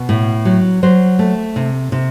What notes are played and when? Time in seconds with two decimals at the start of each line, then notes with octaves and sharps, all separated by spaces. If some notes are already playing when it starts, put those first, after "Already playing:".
Already playing: B2
0.09 A2
0.45 F#3
0.83 F#3 C5
1.19 A3
1.56 C3
1.92 C3